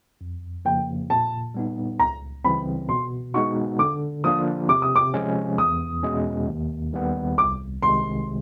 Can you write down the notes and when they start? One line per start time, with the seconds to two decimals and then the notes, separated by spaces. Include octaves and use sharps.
0.21 F2
0.65 C#3 F3 A#3 G5
1.10 A#2 A5
1.54 G3 B3 D#4
1.99 C#2 A#5
2.44 C#3 E3 G3 C4 B5
2.89 B2 C6
3.34 G#3 B3 D#4 F#4 C#6
3.79 D3 D6
4.24 F3 A#3 D4 F4 D#6
4.69 C3 D6
4.82 D#6
4.96 D6
5.14 F3 G#3 C#4
5.58 E2 D#6
6.03 B2 G#3 C#4
6.48 D#2
6.93 D#3 G3 B3
7.38 C2 D6
7.83 C3 D#3 G#3 C6